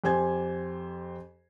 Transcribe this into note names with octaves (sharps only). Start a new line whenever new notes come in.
F2 G4 C5 G#5 G#6